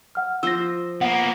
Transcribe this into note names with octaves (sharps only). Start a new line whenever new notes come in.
F#5 F6
F3 C5 E6 A#6
A#3 B3 F#5